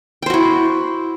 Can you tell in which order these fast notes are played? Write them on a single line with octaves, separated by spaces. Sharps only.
G5 C5 F#4 E4